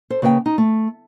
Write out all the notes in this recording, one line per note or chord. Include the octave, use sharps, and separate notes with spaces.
A4 C5
C#3 A#3 B4 D5 G5
D#4
A3